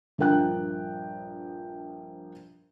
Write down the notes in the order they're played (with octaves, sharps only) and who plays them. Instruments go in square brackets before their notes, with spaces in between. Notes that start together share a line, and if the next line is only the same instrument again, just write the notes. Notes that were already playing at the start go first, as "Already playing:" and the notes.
[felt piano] A#1 G2 F3 A#4 G5 F#6